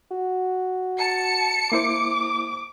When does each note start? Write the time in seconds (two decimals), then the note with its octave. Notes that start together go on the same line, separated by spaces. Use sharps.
0.11 F#4
0.99 A5 C#7
1.72 A#3 E4 C5 D6